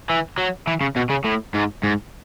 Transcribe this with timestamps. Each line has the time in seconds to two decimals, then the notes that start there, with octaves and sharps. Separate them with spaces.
0.10 E3
0.38 F#3
0.67 E3
0.81 C#3
0.96 B2
1.10 C#3
1.25 A2
1.54 G#2
1.83 G#2